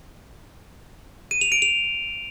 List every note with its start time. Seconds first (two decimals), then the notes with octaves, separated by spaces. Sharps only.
1.31 D#7
1.41 F7
1.52 D7
1.62 F7